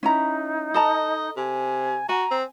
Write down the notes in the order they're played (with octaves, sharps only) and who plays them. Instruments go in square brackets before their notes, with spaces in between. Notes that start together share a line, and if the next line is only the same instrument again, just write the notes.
[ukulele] C#4 E4 A#5 [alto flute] D#4
[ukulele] A4 A5 A#5 [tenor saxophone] D#5
[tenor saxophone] C3 [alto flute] G#5
[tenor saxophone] F#4 [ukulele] G#5 [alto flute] A#5
[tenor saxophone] C4